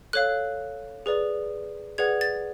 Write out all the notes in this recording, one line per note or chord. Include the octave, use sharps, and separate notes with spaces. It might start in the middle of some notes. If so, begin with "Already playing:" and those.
A4 C#5 F5 F#6
G#4 B4 D5
G#4 B4 D5 F#5 G#6
A6